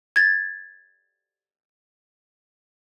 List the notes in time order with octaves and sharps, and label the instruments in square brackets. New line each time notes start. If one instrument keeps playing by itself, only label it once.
[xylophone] G#6 A6